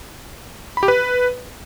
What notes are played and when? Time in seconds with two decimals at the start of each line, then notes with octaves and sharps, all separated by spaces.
0.77 B5
0.83 G4
0.88 B4